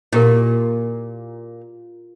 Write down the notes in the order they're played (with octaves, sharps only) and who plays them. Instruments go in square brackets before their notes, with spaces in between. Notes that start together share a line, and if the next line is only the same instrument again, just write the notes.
[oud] A#2 [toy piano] E4 G4 A#4